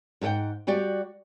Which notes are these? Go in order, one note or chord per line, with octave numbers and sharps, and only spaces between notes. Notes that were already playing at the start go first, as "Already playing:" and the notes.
G#2 F#4 A4 F#5 G5
G3 F#4 G4 D5